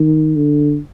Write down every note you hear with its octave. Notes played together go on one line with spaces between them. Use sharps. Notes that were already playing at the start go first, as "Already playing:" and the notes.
Already playing: D#3
D3